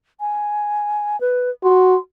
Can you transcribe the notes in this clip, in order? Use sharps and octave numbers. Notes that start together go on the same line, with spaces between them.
G#5
B4
F#4 C6